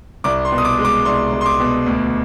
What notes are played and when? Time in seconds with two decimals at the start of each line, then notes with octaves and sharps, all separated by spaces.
0.24 C2 D6
0.45 C6
0.52 B2
0.58 D#6
0.65 D6
0.79 G#3
0.85 D6
1.05 C2 C6
1.32 C2
1.41 C6
1.46 D6
1.60 B2
1.87 D2